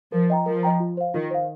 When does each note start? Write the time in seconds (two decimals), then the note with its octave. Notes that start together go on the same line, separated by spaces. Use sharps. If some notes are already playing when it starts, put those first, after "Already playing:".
0.12 F3 A#4
0.30 D#5 G5 A#5
0.46 F3 A#4
0.63 D#5 G5 A#5
0.80 F4
0.97 C5 F5
1.14 D#3 F4
1.31 C5 F5